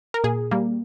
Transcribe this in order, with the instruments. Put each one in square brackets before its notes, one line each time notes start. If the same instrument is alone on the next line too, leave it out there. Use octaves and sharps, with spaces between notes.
[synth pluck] A#4
A#2 G#4
G3 A#3